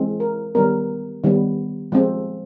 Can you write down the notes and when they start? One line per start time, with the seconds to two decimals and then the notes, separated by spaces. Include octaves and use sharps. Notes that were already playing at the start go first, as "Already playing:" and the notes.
Already playing: E3 G#3 C4
0.20 A#4
0.55 D#3 G3 B3 A#4
1.24 D#3 G3 B3
1.92 F3 G#3 C4